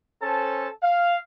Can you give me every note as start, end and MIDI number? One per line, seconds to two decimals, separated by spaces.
0.22 0.69 61
0.22 0.69 69
0.22 0.69 72
0.22 0.69 81
0.83 1.17 77